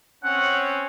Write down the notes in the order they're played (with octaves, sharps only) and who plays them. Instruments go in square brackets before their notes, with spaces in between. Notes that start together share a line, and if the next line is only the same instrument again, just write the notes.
[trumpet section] C4 C#4 C#5 [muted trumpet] F#5